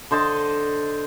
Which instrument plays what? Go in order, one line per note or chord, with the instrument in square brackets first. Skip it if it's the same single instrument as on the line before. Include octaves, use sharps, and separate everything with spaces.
[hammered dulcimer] D3 C5 D#5 A5